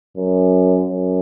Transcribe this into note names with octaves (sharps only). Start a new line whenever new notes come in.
F#2
F#2